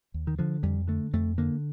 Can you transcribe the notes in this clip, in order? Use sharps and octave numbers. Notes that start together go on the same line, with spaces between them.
D#2
D#3
D3 F3
F2 G3
D3 A3
F2 A3
D3 A#3